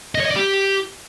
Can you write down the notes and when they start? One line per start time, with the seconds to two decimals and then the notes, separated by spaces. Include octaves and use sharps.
0.15 D#5
0.20 C#5
0.25 D#5
0.31 D5
0.36 G4